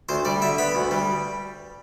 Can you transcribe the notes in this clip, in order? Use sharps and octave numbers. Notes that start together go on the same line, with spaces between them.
D2 C5
G3 D5
D3 E5
B3 B5
D2
G3